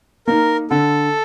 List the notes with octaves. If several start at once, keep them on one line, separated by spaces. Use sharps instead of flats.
A#3 D#4 A#4
D3 A4